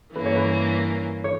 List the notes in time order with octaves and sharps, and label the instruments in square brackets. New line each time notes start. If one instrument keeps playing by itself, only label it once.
[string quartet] G2 E3 A#3 C#4 [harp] B4
[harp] C#5
B4
C#5